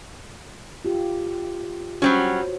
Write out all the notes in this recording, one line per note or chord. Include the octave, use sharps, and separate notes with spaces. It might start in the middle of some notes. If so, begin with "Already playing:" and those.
F4 G4
F#3 G3 C#4 F#4 C5 C#5